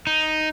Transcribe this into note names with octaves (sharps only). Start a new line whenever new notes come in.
D#4